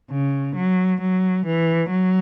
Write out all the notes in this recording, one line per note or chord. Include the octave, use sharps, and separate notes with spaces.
C#3
F#3
F#3
E3
F#3